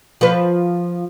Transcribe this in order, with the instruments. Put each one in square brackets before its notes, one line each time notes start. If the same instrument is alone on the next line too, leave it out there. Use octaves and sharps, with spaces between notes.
[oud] F3 B4